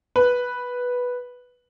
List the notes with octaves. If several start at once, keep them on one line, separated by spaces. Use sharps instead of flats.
B4